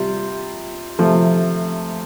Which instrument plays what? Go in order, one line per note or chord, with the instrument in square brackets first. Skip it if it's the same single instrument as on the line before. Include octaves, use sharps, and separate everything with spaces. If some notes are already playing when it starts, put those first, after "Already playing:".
Already playing: [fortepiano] C3 G3 F4
C3 F3 A3